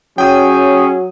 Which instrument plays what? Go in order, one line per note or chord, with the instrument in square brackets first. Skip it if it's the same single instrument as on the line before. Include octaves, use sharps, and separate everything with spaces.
[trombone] F#3 [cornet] C#4 [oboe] G#4 [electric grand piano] G5 D#6